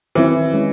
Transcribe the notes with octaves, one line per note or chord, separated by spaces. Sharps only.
D#3 E3 F#3 C4 E4
G#3 C#4 E4